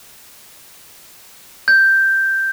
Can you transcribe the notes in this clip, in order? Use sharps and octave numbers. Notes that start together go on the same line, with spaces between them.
G6